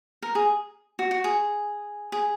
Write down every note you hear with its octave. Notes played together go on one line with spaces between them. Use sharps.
A#4
G#4
F#4
F#4
G#4
G#4